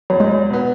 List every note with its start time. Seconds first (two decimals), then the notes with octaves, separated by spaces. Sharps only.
0.10 E2 F#3
0.20 G#3
0.31 F#3
0.50 B2 B3